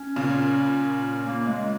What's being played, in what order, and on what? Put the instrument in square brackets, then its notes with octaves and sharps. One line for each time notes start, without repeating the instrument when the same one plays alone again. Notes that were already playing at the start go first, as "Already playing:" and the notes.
Already playing: [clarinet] C#4
[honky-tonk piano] A#2 C#3
[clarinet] A#3
G#3